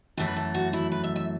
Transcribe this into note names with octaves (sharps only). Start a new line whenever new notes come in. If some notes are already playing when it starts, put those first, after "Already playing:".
F#2 E3 A3 A4
B4
A4
F#4
E4
B4
E5
E5